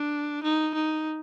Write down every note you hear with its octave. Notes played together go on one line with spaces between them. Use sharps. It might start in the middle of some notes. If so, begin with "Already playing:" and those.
Already playing: D4
D#4
D#4